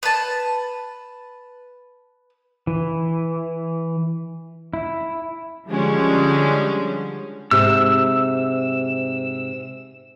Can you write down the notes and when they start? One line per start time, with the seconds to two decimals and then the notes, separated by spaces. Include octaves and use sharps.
0.03 B4 A5
2.67 E3
4.74 E4
5.68 D3 F3 G3 G#3 C#4
7.51 G#2 C3 E6